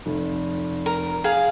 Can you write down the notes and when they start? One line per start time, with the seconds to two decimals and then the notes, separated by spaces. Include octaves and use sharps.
0.06 F1
0.86 A#4
1.24 G#4 F5